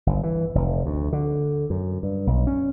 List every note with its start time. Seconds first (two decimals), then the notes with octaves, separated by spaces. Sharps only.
0.07 G1
0.23 E3
0.55 F1
0.86 D2
1.13 D3
1.70 F#2
2.03 G2
2.27 B1
2.47 C#4